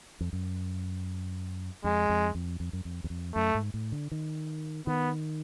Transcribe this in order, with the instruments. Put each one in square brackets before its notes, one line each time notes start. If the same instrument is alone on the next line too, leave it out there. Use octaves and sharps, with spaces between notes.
[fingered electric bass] F2
F#2
[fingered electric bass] F2 [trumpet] G#3
[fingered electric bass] F2
F2
F2
F#2
F2
E2
F2
[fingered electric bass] F#2 [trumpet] A3
[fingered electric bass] G#2
A2
D3
D#3
[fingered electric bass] D#3 [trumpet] B3